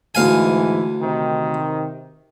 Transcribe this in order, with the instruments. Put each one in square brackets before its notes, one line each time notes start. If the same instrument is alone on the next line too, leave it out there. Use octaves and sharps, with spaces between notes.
[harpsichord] D2 F5 G#5 [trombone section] G#2 E3
[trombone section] C3 D#3